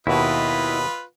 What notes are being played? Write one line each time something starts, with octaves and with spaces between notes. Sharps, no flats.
D#2 B2 E4 F4 B4 D#5